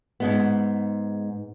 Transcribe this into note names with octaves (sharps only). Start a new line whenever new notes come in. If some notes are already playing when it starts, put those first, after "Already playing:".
G#2 G#3 B3